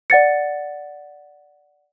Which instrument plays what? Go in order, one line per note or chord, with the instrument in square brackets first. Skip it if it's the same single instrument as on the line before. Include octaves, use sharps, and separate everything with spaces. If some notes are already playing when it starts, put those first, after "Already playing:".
[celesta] D5 F#5 A6 C#7